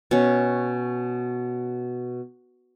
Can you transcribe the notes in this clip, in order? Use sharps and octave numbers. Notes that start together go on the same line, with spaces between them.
B2 C#4